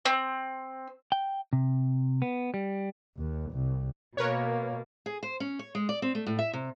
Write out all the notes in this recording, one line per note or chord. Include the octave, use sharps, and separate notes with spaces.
C4
G5
C3
B3
G3
D#2
C2
B2 A#3 A#4 B4 C#5
G#4
C5
C#4
C#5
G#3
D5
C4
A3
A2
E5
C3